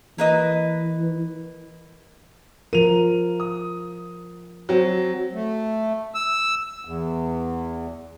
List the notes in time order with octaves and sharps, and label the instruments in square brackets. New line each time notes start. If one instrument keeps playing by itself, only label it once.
[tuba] E3 [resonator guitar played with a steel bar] A#3 B4 D#5
[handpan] F3 F4 A#4 [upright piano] D#7 F7
[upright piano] D#6
F#3 C4
[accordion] A3
E6
[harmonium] E2